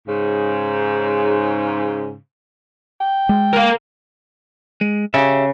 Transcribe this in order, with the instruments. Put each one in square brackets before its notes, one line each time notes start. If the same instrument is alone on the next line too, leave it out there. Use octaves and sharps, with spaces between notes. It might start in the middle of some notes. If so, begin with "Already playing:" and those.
[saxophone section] G#2 C#3
[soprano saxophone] G5
[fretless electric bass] G#3
[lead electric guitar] A#4 F5
[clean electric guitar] G#3
[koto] C#3 [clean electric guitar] G4 E5